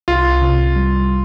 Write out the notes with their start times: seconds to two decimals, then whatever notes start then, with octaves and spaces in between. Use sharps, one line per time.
0.08 C2 F4
0.42 C3
0.76 G3